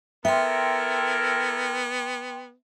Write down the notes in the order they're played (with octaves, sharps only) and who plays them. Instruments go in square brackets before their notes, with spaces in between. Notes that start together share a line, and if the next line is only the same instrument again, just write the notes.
[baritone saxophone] B3 [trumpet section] E4 A4 A#4 [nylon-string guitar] E5 [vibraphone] G5 C6